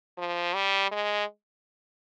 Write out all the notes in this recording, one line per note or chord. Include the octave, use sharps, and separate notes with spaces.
F3
G3
G#3